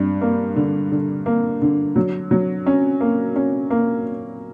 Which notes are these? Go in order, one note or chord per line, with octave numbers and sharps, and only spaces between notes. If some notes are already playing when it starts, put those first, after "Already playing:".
Already playing: G2
A#3
D3
D3
A#3
D3
F#3
F#3
C#4
A#3
C#4
A#3